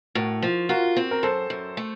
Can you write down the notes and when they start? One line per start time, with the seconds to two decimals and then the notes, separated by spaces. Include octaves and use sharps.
0.15 A2 F#4 A#4
0.42 F3
0.69 F4 F#4 A#4
0.96 C4
1.11 A#4
1.23 F#2 A4 C5
1.50 F#2
1.77 A3